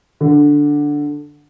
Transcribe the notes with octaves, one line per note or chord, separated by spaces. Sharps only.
D3